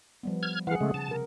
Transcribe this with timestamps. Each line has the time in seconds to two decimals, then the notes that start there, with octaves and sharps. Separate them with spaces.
0.23 F3 G3 B3
0.43 F6 G#6
0.67 E3 G#4 F5 F#5
0.81 C#3 G#3 A3
0.94 C#3 A5
1.09 C3 A#4